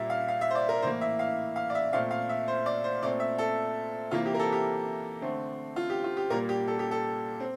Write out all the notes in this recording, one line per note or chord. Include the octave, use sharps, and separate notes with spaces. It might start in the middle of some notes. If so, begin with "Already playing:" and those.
Already playing: A#2 G3 A#3 E5
F5
F5
E5
C5
D5
A#4
A2 E3 A#3 C5
E5
F5
F5
D5
E5
A#2 A3 C4 F5
F5
E5
C5
D5
C5
A#2 A3 C4 D5
E5
A4
C3 E3 A#3 F4
G4
A#4
A4
G4
D3 A3 C4
F4
G4
F4
G4
A#2 G3 A#3 A#4
G4
A4
G4
A4
C4